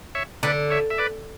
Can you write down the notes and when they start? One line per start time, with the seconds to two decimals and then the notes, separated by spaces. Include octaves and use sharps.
0.15 C#5 E5
0.43 D3 B4 D5
0.70 C#5 E5
0.90 E5
0.98 B4 D5